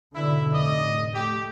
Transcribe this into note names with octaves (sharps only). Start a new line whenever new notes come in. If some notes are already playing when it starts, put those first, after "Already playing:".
G#2 B2 D3 E4
F1 A2 D5 D#5
A3 G4